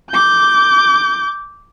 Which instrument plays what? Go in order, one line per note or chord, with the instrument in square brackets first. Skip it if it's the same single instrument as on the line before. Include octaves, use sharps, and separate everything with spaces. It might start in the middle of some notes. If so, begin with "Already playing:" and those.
[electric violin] D6 G6